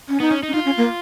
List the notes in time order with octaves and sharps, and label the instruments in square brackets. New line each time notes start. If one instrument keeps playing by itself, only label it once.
[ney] C#4
[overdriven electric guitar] B3 [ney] D#4
[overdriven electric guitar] C#4
D#4
[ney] C#4
[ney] D#4 [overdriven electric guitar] F4
[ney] C#4
A#3